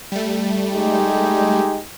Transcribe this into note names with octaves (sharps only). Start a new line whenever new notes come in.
G3 A3
G#3 D#4 G4